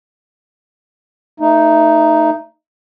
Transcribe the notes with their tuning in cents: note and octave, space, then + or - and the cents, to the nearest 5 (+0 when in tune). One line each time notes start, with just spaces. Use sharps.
A3 +25 D#4 +0